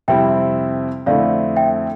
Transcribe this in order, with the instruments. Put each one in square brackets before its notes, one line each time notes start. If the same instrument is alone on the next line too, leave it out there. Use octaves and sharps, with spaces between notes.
[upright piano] F2 C3 G3 C4 E4 [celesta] E5 G5
[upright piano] F2 D3 A3 C4 E4 [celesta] D5 F5
[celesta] E5 G5